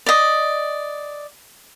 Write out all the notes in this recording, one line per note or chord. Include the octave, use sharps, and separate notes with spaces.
D5 D#5